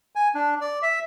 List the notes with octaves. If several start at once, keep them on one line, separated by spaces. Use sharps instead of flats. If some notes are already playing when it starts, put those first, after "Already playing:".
G#5
D4
D5
E5